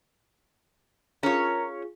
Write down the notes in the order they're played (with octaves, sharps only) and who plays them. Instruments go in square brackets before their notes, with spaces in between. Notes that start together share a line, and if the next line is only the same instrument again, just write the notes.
[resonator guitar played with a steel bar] C#4 C#5 [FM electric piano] F4 G#4 [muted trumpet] A#4